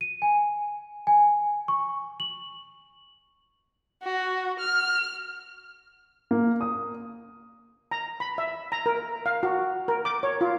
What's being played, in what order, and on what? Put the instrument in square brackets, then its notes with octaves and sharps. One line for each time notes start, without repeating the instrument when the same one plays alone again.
[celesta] D#7
G#5
G#5
C#6
F#7
[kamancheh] F#4
F6
[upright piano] A#3
D#6
[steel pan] A#5
B5
E5
A#5
A#4
F5
F#4
A#4
D6
C#5
F4